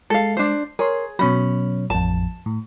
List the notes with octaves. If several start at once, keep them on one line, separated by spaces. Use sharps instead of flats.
G#3 A4 F5
D4 C5
G#4 A#4 C#5 C6
B2 F#3 C#4 B5
A1 F2 A5
A2